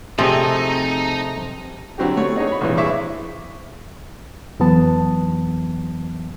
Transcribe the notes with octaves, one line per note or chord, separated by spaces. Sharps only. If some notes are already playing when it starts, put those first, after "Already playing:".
C3 F3 A3 C4 D#4 G#4
D3 F#3 C4 E4 F#4 G4
A3 B3 C#5
D#4 G#4 C#5 D#5 F#5
C#5 B5
A#1 G2 C3 E3 G3 C#5
E4 G#4 C5 E5 C#6 D6
F2 E3 F#3 B3 A5